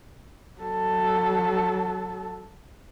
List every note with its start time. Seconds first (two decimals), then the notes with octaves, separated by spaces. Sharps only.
0.60 F#3 A4